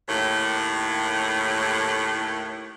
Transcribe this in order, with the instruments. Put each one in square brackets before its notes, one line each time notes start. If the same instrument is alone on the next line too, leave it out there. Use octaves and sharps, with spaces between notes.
[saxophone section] D#2 A2